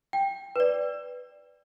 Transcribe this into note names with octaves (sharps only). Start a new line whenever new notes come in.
G5
B4
D5